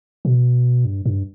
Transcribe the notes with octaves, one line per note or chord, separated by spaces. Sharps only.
B2
G2
G2